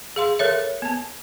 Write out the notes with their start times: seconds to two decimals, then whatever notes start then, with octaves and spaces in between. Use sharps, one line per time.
0.16 G#4 F5 C6
0.39 A4 A#4 C#5 E5
0.82 B3 A5